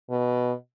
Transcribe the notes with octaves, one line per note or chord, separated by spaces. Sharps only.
B2